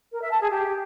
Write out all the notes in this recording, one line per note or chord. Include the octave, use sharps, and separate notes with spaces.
A#4
E5
A5
G#4
G4